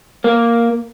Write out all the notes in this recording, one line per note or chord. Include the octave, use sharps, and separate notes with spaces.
A#3